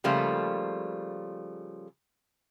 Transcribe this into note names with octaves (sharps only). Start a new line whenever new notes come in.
C#3 F3 G3 A3 A#3 F4